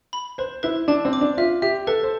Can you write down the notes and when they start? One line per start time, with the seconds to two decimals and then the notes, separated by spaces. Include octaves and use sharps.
0.13 B5
0.38 B4 C5
0.63 E4 B4
0.88 D4 A5
1.05 C4
1.13 D6
1.21 D4
1.37 F4 E5
1.62 G4 E5
1.87 A4 B4
2.03 C5